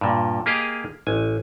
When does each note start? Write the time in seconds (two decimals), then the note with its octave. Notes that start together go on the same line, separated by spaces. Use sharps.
0.01 G2 A#2
0.46 A#3 G4 G#4 D#5 F5
1.07 A1 G#5